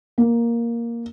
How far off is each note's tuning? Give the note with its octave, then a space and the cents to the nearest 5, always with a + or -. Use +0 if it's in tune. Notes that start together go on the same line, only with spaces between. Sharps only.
A#3 +5